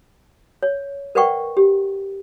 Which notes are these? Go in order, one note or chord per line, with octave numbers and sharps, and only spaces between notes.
C#5
A#4 B4 D5 F#5 G5 C#6
G4